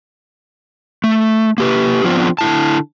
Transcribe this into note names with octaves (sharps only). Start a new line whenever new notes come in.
A3
A#3 G4 B4
F3 B3 C4 D4 F4
D3 E4 A5